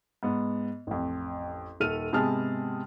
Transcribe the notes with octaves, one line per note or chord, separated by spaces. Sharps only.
G#2 B3
A1 F2
D#1 A4 F6 D#7 F7
G#2 C3 B3 G#4 A5 F6